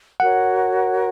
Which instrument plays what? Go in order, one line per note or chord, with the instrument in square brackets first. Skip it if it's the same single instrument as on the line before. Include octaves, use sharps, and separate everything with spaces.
[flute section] F#4 A#4 C#5 [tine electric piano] F#5